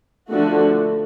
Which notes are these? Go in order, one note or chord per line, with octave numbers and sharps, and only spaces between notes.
D3 F3 A3 D4 F#4